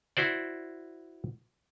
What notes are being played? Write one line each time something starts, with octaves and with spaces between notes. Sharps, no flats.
E4 F#4 C5 D5